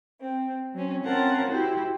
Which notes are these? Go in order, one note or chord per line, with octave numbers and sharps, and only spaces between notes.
C4
F#3 C4 C#4
C4 C#4 F4 A#4 F#5 A5
E4 F#4 G4 C5